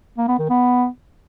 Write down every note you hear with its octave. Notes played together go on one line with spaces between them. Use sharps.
A#3
B3
D#3
B3